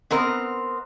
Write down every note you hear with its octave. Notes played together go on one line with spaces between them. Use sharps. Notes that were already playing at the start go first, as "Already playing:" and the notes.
B3 C4 A#4 D#5